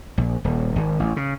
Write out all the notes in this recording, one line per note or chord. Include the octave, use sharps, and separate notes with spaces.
A#1
D#1
G#1
A1
C#3